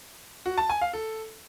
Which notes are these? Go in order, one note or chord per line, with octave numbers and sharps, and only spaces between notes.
F#4
A5
G#5
F5
A4